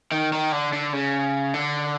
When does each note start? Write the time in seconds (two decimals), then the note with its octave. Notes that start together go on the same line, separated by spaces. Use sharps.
0.12 D#3
0.33 D#3
0.52 D3
0.73 D3
0.93 C#3
1.54 D3